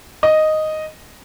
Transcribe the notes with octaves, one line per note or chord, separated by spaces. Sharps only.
D#5